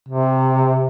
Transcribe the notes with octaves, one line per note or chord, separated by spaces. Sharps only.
C3